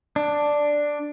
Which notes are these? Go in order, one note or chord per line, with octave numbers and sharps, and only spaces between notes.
D4